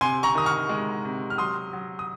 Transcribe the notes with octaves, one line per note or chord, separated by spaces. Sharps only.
C3 G#5 C6
A#5 C#6
D#3 D#6
C#6 F6
G#3
C3
F6
F#3 C6 D#6
F#3
D#6